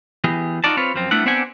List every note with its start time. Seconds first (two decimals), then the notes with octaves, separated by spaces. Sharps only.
0.24 E3 B3 G4 G#4
0.64 D#4 F4 F#4 D5 A5
0.77 C4 F4 B4 C#5
0.94 F#2 F3 C4
1.11 G3 A3 B3 D4 E4 F#5
1.26 B3 C4 D4 G4 F#5 G#5